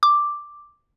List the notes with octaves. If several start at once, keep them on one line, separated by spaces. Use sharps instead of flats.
D6